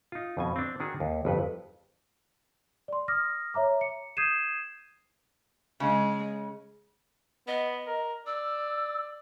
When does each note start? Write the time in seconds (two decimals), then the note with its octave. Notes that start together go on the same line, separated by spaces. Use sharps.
0.12 D#4 F4
0.37 F2 B2 G#5
0.56 C4 D4
0.80 D#3 D4 F#4 G#4
1.00 D#2
1.25 G1 F2 B4
2.88 D5 C6
3.08 D6 D#6 F6 A#6
3.54 C#5 E5 A#5 D6
3.81 C#7
4.17 D#6 G6 G#6 C7 D#7 E7
5.80 C#3 G#3
7.47 B3 D#5
7.87 A#4
8.26 D5 E6